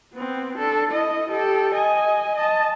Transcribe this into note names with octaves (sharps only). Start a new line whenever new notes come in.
B3 C4
D4 A4
E4 D#5
G4 A4
D#5 G#5
D#5 A5